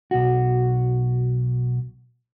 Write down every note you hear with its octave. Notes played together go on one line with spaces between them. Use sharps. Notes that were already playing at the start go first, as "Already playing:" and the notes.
B1 F#4